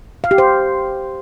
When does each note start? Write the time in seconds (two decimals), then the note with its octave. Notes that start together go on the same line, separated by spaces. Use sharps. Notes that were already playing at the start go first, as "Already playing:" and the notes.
0.24 F5
0.31 G4
0.38 C5